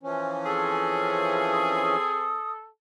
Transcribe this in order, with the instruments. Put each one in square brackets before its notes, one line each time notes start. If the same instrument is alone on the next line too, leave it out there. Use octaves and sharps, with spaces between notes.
[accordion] E3 F3 C#4
[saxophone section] C4 G#4 [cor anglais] A4
[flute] D#6